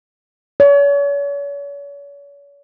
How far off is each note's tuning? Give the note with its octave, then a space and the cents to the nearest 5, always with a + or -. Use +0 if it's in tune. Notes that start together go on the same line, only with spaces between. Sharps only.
C#5 +40